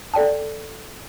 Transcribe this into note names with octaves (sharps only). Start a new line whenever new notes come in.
A4 D5 G5 A5